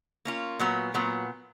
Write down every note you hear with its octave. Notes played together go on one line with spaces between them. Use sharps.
A#3 C#4 F4
A#2 F#3 B3
A#2 F#3 B3